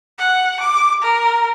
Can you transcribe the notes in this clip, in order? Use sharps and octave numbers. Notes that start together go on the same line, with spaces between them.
F#5
D6
A#4